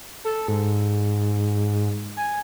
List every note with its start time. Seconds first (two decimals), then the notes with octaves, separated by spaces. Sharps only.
0.25 A4
0.48 G#2
2.17 G#5